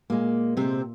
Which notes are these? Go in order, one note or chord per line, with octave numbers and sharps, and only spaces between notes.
A#2 G#3 A#3
C3 C4